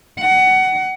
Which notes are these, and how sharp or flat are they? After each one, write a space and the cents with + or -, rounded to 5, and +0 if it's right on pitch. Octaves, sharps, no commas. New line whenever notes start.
F#5 +20